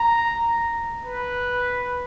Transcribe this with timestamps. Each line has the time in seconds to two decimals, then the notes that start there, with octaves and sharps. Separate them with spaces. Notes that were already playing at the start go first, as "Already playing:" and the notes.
Already playing: A#5
1.03 B4